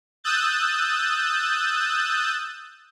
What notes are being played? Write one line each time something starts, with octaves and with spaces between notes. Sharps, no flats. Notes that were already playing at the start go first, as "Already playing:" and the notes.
D#6 E6 F#6 G6 A6